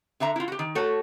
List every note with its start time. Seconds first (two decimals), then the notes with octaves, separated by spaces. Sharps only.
0.20 D3 A4 E5 A#5
0.36 E4 F4
0.48 F#4 G4
0.59 D#3
0.75 A3 F#4 A4 C#5